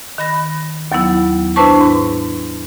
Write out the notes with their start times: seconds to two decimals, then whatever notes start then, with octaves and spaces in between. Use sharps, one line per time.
0.18 D#3 B5 A#6
0.92 D#2 F#3 B3 E4
1.56 D4 E4 B4 C5 A5 C#6
1.81 G#2